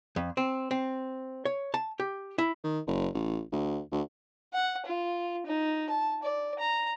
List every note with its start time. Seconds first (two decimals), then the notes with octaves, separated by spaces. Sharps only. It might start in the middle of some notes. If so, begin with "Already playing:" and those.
0.16 F2
0.37 C4
0.71 C4
1.45 C#5
1.74 A5
2.00 G4
2.38 E4
2.64 D#3
2.87 F#1
3.14 A1
3.52 D2
3.91 D2
4.53 F#5
4.86 F4
5.46 D#4
5.90 A5
6.23 D5
6.59 A#5